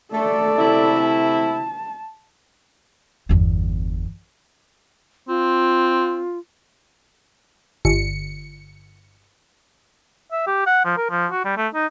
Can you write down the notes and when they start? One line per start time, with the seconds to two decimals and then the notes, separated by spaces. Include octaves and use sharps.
0.14 A3 A4 D5
0.57 C3 A3 E4
1.01 A5
3.29 G1 E2
5.28 C4 F4
7.85 G1 C#7
10.32 E5
10.47 G4
10.66 F#5
10.85 F3
10.97 A#4
11.10 F3
11.31 F#4
11.45 G3
11.57 A3
11.74 D#4